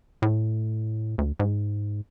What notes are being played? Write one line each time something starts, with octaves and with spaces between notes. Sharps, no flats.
A2
D2
G#2